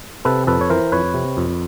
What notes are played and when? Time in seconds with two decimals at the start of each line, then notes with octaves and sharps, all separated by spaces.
0.25 C3 A4 B4
0.47 F2 A4 B4
0.61 C#5
0.70 E3 A#4 C5
0.92 F2 B4 C#5
1.14 C3
1.37 F2